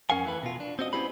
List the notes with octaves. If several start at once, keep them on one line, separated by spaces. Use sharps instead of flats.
F2 C#4 A#4 F5 F#5 G#5
E3 A3 B4
B2 F4
D4
C4 F#4 D#5
B3 C#4 E4 G4 C5 B5